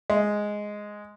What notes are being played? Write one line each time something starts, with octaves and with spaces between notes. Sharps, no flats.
G#3